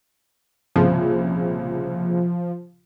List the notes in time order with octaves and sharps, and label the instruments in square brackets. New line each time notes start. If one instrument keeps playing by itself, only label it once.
[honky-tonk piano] C2 A#2 C#3 [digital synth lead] F3